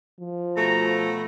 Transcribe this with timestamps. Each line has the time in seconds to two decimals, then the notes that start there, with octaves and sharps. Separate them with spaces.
0.20 F3
0.57 B2 A3 A#5